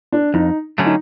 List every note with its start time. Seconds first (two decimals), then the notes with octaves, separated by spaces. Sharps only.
0.12 D4
0.34 F2 D#4
0.78 D3 F#3 A3 C#4
0.86 D#4